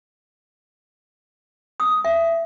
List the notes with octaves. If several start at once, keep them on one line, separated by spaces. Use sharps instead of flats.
D#6
E5